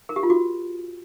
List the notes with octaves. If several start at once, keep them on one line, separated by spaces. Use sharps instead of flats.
A#4
G4
F4
F#4